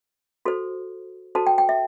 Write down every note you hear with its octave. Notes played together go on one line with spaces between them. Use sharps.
F#4 A4 C5
F#4 A4 C5 A5
G5
G5
E5